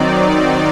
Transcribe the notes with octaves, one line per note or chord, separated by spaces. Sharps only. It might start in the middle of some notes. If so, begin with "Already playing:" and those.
Already playing: D#3 F#3 C4 D#4 D5